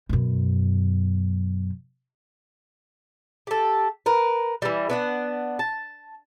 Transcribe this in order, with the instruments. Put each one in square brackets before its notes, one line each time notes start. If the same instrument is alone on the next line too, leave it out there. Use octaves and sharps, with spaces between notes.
[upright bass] F#2 B2
[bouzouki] G4 A4
A#4 B4
E3 G3
B3 D4 F#5
A5